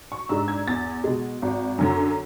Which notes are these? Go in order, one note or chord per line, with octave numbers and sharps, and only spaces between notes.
C#6
G#2 G#3 D4 E6
G#6
E2 A6
B2 G#3
G#1
F#2 D3 F#3